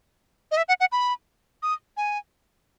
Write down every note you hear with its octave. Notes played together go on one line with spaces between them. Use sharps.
D#5
E5
F#5
F#5
B5
D#6
G#5